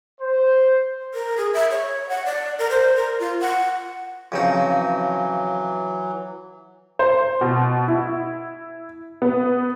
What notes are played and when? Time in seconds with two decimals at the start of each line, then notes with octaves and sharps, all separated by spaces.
0.21 C5
1.14 A#4
1.37 G#4
1.54 E5
1.71 C#5
2.09 F#5
2.26 D5
2.59 A#4
2.70 C5
2.96 A#4
3.20 F4
3.41 F#5
4.32 F2 C#3 E3 F#3 D#4
6.99 C5
7.41 B2
7.88 E4
9.22 B3